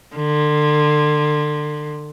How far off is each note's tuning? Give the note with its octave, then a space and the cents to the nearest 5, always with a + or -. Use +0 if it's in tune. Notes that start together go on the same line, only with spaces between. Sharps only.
D3 +30